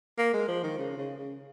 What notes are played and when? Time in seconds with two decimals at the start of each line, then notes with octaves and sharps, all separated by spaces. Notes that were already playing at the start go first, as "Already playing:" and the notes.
0.18 A#3
0.34 G#3
0.48 F3
0.63 D#3
0.78 C#3
0.98 C#3
1.18 C#3